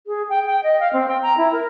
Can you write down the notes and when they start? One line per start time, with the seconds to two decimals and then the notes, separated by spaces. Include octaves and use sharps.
0.07 G#4
0.29 G5
0.46 G5
0.64 D#5
0.80 F5
0.93 C4
1.08 G5
1.22 A#5
1.37 E4
1.52 A#4